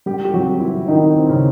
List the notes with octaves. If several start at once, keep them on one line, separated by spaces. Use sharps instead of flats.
G3 G4
G4
F#3 F#4
E3 E4
D#3 D#4
C4
C#3 C#4